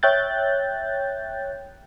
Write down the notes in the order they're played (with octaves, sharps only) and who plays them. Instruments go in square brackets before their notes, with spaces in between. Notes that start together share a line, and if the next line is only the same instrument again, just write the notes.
[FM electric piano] C#5 E5 G5 F#6 G6 A6